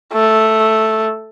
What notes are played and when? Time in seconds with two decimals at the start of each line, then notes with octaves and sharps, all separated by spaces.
0.13 A3